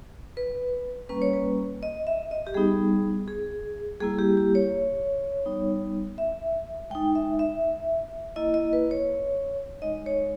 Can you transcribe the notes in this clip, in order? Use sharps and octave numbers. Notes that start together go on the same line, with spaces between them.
B4
G3 A#3 C#4 B4
C#5
B4
D#5
E5
D#5
G4
G3 B3 D#4 G#4
G#4
G3 A#3 E4 G#4
G4
G4
C#5
G3 B3 D#4
E5
G#3 D#4 G5
E5
E5
A#3 E4 D#5
D#5
B4
C#5
G#3 D#4 D#5
C#5